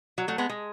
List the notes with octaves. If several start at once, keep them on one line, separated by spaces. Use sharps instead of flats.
F#3
F#3 A3
G#3 B3
G#3